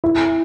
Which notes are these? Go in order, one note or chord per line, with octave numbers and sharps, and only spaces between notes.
E4